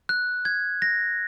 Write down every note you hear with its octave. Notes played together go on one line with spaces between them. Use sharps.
F#6
G#6
A#6